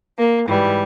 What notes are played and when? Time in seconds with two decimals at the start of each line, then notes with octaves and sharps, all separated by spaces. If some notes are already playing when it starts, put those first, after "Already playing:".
0.18 A#3
0.48 G#2 E3 G3